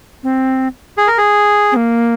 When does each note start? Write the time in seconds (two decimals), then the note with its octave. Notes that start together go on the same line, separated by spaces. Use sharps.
0.23 C4
0.98 G#4
1.07 A#4
1.18 G#4
1.72 C4
1.76 A#3